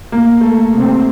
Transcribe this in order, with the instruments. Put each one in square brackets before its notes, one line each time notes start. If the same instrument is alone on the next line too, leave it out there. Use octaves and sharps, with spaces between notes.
[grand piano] A#3
A3
[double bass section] C3 G3 C4